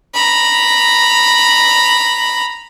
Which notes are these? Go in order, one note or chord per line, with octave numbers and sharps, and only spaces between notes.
A#5 B5